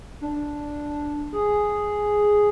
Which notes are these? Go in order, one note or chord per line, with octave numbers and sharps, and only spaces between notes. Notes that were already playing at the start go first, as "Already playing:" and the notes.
D4
G#4